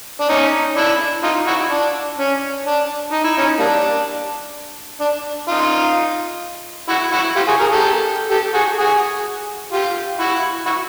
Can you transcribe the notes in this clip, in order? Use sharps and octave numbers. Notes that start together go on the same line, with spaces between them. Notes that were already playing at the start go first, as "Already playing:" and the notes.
D4
C#4 D#4
D4 E4
D#4 F4
E4 F#4
D4
C#4
D4
D#4
E4
C#4 D#4
G3 A#3 D4
D4
D#4 F4
E4 F#4
E4 F#4
F4 G4
F#4 G#4
G#4 A#4
G4 A4
G4 A4
F#4 G#4
F#4 G#4
F4 G4
E4 F#4
E4 F#4